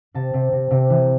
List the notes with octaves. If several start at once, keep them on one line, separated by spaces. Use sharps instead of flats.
C3 A5
C3
C3
C3
E3